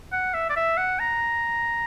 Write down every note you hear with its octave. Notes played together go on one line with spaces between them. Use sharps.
F#5
E5
D5
E5
F#5
A#5